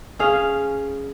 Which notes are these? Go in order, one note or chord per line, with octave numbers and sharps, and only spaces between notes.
C#4 G#4 F5